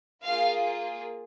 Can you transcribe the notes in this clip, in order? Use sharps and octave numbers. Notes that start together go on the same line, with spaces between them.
A#3 F4 G#4 F5